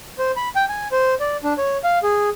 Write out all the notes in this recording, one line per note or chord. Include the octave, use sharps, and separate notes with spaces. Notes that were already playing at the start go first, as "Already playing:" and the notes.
C5
B5
G5
G#5
C5
D5
D4
C#5
F5
G#4